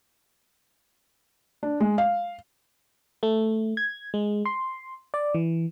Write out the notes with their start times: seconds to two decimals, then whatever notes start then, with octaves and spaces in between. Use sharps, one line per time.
1.63 D4
1.80 G#3
1.98 F5
3.23 A3
3.77 G#6
4.14 G#3
4.45 C6
5.14 D5
5.34 E3